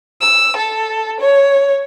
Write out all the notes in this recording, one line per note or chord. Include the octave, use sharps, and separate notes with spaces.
E6
A4
C#5